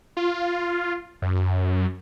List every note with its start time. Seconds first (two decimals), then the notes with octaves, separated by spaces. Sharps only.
0.17 F4
1.22 F#2